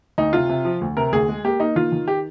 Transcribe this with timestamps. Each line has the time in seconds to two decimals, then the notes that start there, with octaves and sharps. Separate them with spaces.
0.18 D2 D#4
0.33 C3 F4
0.49 C3
0.65 F3
0.81 D2
0.97 C3 A#4
1.12 D2 G#4
1.29 G#3
1.45 A#3 G4
1.60 A#3 D#4
1.76 D#3 F4
1.92 D#3
2.08 G4